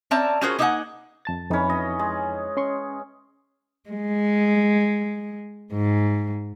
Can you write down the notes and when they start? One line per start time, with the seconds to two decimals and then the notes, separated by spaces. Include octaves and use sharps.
0.11 C4 C#4 D5 E5 A5 A#5
0.42 C#4 F4 F#4 G#4 A#4 C5
0.59 A#3 D#4 D#5 E5 F#5 G#5
1.25 F2 A5 A6
1.51 F2 E3 C#4 D#4
1.70 D#5
1.99 G#3
2.57 C#4 C6 C#6
3.89 G#3
5.73 G#2